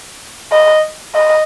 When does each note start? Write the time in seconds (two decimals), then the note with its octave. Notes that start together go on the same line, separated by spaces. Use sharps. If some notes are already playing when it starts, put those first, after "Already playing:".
0.52 D#5
1.15 D#5